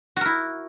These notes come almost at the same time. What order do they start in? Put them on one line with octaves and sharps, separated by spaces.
F#4 A#4 E4